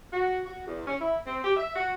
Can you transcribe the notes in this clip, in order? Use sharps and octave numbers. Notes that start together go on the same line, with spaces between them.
F#4
F#4
E2
C#4
E4
C4
G4
E5
F#4